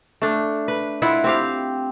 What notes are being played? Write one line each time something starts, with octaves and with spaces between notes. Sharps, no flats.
A3 D4
B4
E4 F4 E5 F#5
C4 G4 F5